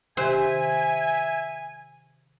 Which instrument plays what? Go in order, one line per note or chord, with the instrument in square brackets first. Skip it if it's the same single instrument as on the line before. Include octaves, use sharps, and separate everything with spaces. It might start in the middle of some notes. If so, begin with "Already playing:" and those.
[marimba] C3 D#3 G4 [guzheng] C5 [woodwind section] E5 G#5